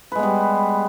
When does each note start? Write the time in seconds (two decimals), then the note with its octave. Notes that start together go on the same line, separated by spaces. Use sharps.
0.12 B4
0.15 G#3
0.19 B3
0.23 G3